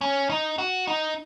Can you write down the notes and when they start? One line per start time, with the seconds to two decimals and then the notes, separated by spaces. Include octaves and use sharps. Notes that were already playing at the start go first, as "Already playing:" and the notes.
0.01 C#4
0.30 D#4
0.58 F#4
0.87 D#4